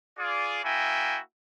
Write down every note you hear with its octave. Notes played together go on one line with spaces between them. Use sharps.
F4 G#4 D5
A#3 E4 F#4 E5 G5 G#5